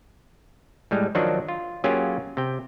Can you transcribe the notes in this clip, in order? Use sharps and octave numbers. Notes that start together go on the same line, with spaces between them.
A2 G3 G#3
D#3 F3 F#3 D4 D#4 F#4
F4
F#3 A#3 C#4 F4 G4 G#4
C3 G5